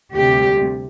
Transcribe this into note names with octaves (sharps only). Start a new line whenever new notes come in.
D2 C3 G3 G4